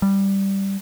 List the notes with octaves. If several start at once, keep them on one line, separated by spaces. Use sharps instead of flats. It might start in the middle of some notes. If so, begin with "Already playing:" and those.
G3